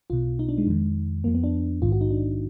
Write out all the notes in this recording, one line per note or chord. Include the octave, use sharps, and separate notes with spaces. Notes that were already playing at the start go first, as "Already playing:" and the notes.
B1 B2 F4
D#4
D4
G#3
F2 D#3
F2 F3 A#3
B3
D4
A#1 G#2 D#3 F4
F#4
D#4
D4